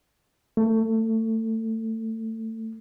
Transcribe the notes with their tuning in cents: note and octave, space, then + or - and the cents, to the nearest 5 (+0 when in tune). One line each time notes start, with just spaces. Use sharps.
A3 +25